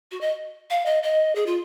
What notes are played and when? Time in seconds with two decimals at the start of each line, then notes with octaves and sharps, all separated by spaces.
0.11 F#4
0.21 D#5
0.70 F5
0.86 D#5
1.03 D#5
1.35 G#4
1.46 F4